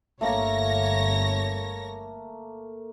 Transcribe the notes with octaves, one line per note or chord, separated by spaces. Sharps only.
G1 A3 A#3 A#4 C#5 A#6